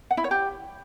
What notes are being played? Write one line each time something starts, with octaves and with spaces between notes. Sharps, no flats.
F#5
E4
C#5
G4